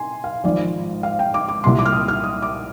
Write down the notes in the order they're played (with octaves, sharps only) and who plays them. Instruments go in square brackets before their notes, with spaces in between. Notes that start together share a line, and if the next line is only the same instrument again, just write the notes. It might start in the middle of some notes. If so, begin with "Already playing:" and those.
Already playing: [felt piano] G#5 C6
F5
G#1 G#2 F3 D5
F5
G5
D6
D6
C2 A#2 G3 C6
D6
F6
D#6
F6
D#6
D6